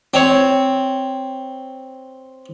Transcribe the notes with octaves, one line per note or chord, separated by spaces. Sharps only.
C4 C#5